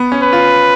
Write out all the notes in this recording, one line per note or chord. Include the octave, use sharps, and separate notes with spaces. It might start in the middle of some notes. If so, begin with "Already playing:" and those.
Already playing: B3
C#4
B4
F4